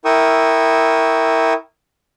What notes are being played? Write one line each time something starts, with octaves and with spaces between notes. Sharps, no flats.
E4 A#4 G5 C#6 D#6 E6